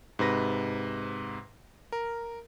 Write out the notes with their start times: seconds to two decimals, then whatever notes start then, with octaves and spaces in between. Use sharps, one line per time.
0.19 G#2 C3 B4 A#6
1.92 A#4